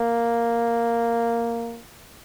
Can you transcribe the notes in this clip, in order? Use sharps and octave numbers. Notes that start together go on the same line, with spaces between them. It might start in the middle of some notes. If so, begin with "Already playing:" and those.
Already playing: A#3